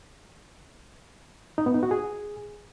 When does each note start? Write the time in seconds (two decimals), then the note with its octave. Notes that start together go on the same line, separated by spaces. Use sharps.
1.58 D#4
1.66 B3
1.74 D#4
1.83 F#4
1.91 G#4